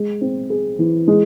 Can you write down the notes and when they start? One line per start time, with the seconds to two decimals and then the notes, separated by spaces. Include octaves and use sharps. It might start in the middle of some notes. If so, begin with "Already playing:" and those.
Already playing: G#3
0.21 C4
0.50 G#4
0.79 E3
1.08 G#3